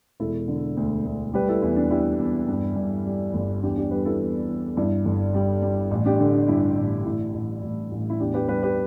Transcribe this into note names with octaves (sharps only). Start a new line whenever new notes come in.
E1 E4 A4
D3
D2
D2
G3 G4 B4
E4 A4
E2 E4
D4
G3 E4
E2
G2
G2
G3
G1
E2 D4 G4
D4 G4
G3 G4 B4
E4 A4
E2
E2
G2 E4
G1
G3
G3
A1
D4 G4
D3
D4
G2 E4
A1
A1 E4
A1
A1
A1
E4
E2 D4 G4
G4 B4
G3 G4 B4
G4 B4